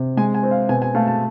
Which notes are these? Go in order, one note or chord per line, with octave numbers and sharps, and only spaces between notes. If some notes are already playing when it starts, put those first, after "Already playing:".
Already playing: C3
G#3 G#5
G#5
C4
F5
B2 G#5
G#5
A3 F5
A5